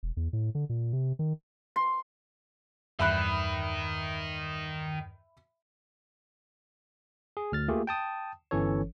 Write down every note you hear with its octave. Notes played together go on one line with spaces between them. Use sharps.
E1
E2
A2
D3
A#2
C3
D#3
C6
E2 G2 D#3 E5 B5 F#6
G#4
D2 F6 A6
A3 A#3 F4 G4 G#4
G5 A5 D#6
G1 E3 C#4 A4 C#5